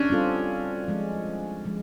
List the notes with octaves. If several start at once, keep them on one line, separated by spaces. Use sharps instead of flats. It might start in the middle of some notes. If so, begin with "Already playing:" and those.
Already playing: C#4 D4
G3 C4 F4 A4
F3 G#3 C#4
F3 G#3